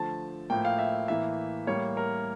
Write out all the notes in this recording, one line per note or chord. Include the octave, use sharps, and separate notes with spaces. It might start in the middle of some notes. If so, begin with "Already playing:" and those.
Already playing: D3 F3 A3 A5
A2 F3 A#3 G5
F5
E5
A2 E3 A#3 E5
A2 G3 A#3 C#5
A#4